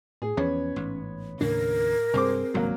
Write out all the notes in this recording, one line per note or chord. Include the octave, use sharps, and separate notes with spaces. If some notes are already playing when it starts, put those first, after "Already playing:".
A2 G#4
E2 F3 B3 C#4 C#5
A1 G#2
D#2 A2 C#3 D4 A#4
G2 C3 C4 G#4 C5 D6
G#1 C#2 G2 F#3 A#3